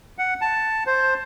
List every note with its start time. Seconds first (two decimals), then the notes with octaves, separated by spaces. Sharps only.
0.18 F#5
0.41 A5
0.87 C5